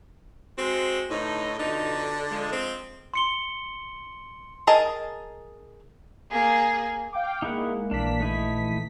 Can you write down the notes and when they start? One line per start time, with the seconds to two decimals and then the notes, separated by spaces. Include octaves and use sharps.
0.58 G#3 C4 F#4
1.10 A2 D3 B3 D#4
1.59 F2 B2 D3 D#4
2.30 F3 G#3
2.52 C4
3.14 C6 C#7 G7
4.67 G#4 A#4 D#5 A5
6.31 A#3 G#4
7.13 F5 G5 D6
7.42 G#3 A#3 D#4 E4 F#5
7.91 A#1 E3 A#3 D4 B6
8.20 A3 D#4 E4